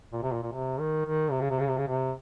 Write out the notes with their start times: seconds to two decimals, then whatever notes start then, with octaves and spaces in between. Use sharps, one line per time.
0.13 A#2
0.23 C3
0.32 A#2
0.43 A#2
0.53 C3
0.79 D#3
1.05 D#3
1.31 C3
1.41 C#3
1.51 C3
1.60 C#3
1.69 C3
1.78 C#3
1.88 C3